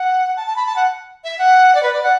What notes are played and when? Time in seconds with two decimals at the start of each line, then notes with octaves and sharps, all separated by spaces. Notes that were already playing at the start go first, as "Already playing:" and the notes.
Already playing: F#5
0.36 A5
0.47 A5
0.56 B5
0.66 A5
0.76 F#5
1.24 E5
1.38 F#5
1.75 D5
1.83 B4
1.93 D5
2.03 F#5